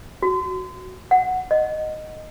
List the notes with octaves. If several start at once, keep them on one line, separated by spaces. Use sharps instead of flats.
F#4
F#5
D#5